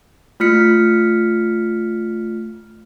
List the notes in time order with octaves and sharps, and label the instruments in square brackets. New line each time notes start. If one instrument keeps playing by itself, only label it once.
[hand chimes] A3 F4 F6 B6 C#7